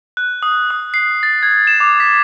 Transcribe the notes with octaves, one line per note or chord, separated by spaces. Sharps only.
F#6
D#6
D#6
C7
A6
G#6
E7
D6
B6